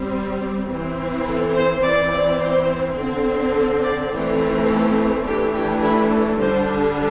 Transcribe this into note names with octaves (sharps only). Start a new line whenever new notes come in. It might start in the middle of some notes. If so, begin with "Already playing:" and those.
Already playing: G3 C4
E3 C4
A4
C5
E3 C4 D5
D5
C5
D3 C4
A4
D5
E3 A3 C4
A4
E3 A3 D4 G4
G4
E4
A4
D3 G3 D4 C5